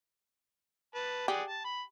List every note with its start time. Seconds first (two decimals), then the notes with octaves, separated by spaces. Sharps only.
0.95 B4 A5
1.28 G4 G#4 D5 F#5
1.47 A5
1.64 B5